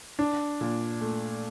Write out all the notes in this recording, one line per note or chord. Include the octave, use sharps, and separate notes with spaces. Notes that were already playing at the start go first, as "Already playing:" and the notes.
D4
A#2
A3